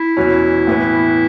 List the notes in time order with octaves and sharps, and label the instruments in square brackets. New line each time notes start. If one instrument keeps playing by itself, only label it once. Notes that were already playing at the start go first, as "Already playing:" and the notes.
Already playing: [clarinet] E4
[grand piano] E2 B2 F#3 C#4
A2 E3 B3